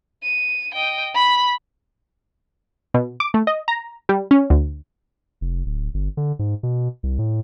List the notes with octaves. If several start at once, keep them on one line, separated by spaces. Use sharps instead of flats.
D#7
D#5 G5
B5 B6
B2
D6
A3
D#5
A#5
G3
C#4
D2
F1
D1
G1
D3
G#2
B2
C2
A2